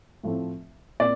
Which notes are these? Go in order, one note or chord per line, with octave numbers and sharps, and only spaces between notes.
A2 F3 A3 C4
A#2 C4 D5